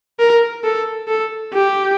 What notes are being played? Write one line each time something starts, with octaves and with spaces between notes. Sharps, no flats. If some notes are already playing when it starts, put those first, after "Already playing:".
A#4
A4
A4
G4